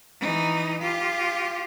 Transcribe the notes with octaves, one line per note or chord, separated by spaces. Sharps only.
E3 D#4
F4 G4